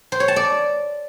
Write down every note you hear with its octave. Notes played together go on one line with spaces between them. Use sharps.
C5
C#5
A5
D5